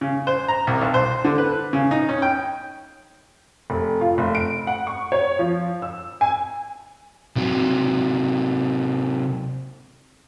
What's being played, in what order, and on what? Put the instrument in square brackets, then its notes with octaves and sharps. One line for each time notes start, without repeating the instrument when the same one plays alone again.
[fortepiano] C#3
C5
A#5
C2
B1
C5
D3
B4
C#3
D#4
C#4
G5
[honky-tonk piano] F1
F4
F1
D7
F#5
C#6
C#5
F3
E6
G#5
[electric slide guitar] C3 F#3